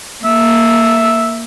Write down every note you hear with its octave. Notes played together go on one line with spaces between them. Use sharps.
A#3 E5